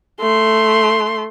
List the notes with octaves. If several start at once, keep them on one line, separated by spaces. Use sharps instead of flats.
A3 C6